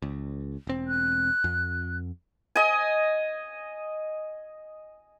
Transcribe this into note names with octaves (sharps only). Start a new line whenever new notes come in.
C#2
E1 C4
F#6
F2
D#5 G#5